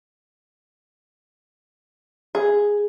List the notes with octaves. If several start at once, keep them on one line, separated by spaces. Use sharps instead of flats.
G#4